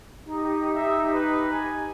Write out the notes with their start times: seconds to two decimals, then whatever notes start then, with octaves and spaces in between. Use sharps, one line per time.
0.25 D#4 G4
0.75 E5
1.13 B4
1.52 G#5